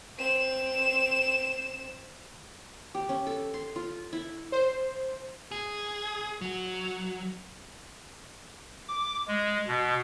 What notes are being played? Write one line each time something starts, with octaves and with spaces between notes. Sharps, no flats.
C4 E7
G4
C#4
A4
C6
F4
E4
C5
G#4
F#3
D6
G#3
B2